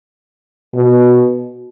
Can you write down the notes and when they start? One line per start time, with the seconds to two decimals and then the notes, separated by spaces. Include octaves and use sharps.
0.74 B2